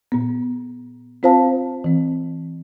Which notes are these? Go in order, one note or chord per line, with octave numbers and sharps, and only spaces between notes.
A#2 B3
C4 F4 C5 F5 A5
E3 C4